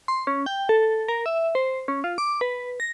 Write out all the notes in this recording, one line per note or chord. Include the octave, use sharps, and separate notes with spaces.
C6
C#4
G5
A4
A#4
E5
C5
C#4
F4
D6
B4
A#6